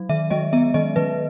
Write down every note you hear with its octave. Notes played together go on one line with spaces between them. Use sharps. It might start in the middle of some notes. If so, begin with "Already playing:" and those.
Already playing: F#3
D#3 E5
G#3 D#5
B3 E5
D#3 D#5
D#3 B4